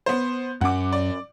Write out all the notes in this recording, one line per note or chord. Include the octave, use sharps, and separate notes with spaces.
B3 C5
F#2 C#4 F#5 D6
D5